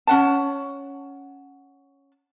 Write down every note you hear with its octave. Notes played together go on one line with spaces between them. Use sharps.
C#4 F#5 A5